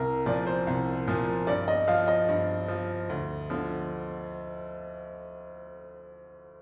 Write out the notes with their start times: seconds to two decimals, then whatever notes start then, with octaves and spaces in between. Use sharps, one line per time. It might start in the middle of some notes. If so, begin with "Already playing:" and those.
Already playing: C2 A#4
0.26 A#2 F3 D5
0.46 C5
0.67 C2
1.07 A#2 F3
1.47 G2 D5
1.68 D#5
1.88 F3 F5
2.08 D#5
2.28 G2
2.68 F3
3.09 D2
3.50 D3 F3